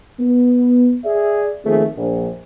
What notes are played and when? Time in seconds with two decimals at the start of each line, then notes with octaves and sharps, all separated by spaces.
0.19 B3
1.04 G#4 D5 E5
1.65 D#2 D#3 F3 A3 C4 G#4
1.97 A#1